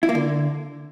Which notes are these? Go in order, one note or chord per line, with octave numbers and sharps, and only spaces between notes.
E4
A#3
D3